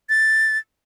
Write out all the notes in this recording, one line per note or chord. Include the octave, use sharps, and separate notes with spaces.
A6